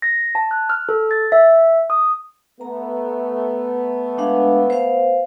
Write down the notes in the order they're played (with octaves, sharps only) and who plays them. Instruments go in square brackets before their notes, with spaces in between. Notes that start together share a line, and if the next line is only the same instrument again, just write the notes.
[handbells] A#6
A5
F#6
F6
A4
A6
E5
D#6
[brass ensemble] A3 B3 [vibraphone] A#5
[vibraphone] G#3 D4 F5
C5 F5